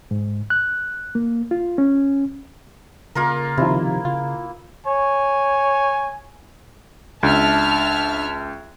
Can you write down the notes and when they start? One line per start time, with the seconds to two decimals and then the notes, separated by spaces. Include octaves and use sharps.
0.11 G#2
0.50 F#6
1.15 A#3
1.51 F4
1.78 C#4
3.15 C#3 A#3 F4 A#4
3.58 C3 D#3 F3 E4
4.05 C#3 F4
4.86 C#5 G#5
7.23 C#2 D4 E5 A5 F6